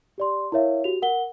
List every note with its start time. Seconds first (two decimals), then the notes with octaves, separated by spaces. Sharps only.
0.18 G4 D5 C6
0.52 E4 A#4 C#5 E5 F5
0.84 F#4 G4 F7
1.02 A#4 F#5 G7